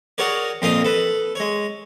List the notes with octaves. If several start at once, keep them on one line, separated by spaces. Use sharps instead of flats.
F#4 G#4 A#4 C#5 D5
F2 A#2 D#5 F5 G5 D#6
A4 B4
G#3 C#5